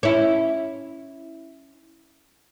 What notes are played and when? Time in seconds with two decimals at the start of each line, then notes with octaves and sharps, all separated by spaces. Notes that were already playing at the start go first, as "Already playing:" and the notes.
0.03 C#4 E4